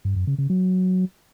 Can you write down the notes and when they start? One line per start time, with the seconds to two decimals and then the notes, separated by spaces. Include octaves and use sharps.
0.05 G2
0.16 F#2
0.27 C#3
0.38 C#3
0.50 F#3